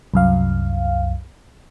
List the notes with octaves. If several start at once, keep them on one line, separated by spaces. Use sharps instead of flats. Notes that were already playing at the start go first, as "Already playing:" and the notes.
C2 F#2 F5